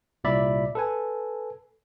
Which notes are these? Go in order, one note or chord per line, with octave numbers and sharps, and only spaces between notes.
C2 A#2 D5 E5 B5
A4 B4 G#5